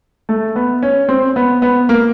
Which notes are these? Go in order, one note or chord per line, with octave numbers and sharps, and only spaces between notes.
A3
B3
C#4
C4
B3
B3
A#3